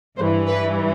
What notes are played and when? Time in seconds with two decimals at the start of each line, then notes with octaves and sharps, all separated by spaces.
0.18 G2 C5
0.22 E3
0.47 B4